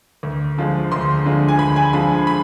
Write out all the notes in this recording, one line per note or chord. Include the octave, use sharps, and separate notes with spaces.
D2
D3 F3 G#3
D2 C6
D3 F3 G#3
G#5
D2 B5
G#5
D3 F3 G#3 B5
B5